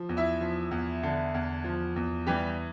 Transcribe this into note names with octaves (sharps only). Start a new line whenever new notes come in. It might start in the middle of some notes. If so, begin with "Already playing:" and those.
Already playing: F3
E2
E4 E5
F3
E2
D3
E2
F3
E2
E3 G3 G4